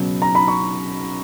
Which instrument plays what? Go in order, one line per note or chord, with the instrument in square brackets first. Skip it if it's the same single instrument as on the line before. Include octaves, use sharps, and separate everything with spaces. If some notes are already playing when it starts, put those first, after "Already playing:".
Already playing: [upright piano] C#2 B2 F#3
A#5
B5
C#6